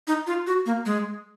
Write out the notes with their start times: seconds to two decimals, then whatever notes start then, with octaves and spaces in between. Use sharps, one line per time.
0.07 D#4
0.27 F4
0.47 F#4
0.66 A#3
0.86 G#3